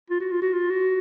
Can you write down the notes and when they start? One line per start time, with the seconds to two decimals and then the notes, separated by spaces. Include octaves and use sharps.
0.10 F4
0.21 F#4
0.31 F4
0.42 F#4
0.53 F4
0.70 F#4